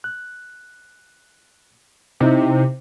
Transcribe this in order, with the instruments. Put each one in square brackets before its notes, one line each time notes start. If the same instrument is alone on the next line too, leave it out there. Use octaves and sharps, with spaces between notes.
[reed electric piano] F#6
[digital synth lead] C3 [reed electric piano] C4 D#4 E4